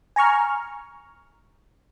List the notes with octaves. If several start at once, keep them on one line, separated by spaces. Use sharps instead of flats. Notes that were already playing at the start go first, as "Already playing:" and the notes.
G#5 A#5 C#6 F6